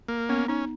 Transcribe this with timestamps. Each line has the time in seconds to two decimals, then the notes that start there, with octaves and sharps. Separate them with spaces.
0.08 A#3
0.29 B3 C#4
0.48 C#4 D#4